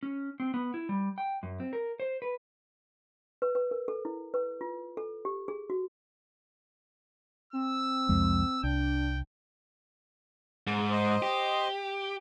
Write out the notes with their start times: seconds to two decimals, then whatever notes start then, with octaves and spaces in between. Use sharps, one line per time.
0.03 C#4
0.40 C4
0.54 B3
0.74 E4
0.89 G3
1.18 G5
1.43 F#2
1.60 C4
1.73 A#4
2.00 C5
2.22 B4
3.42 B4
3.55 B4
3.71 A#4
3.88 A4
4.05 E4
4.34 B4
4.61 F4
4.97 A4
5.25 G4
5.48 G#4
5.70 F#4
7.53 C4 E6
8.09 C2 F2 G#3
8.64 C2 D4 G5
10.67 G#2
10.91 C5 D#5
11.22 G4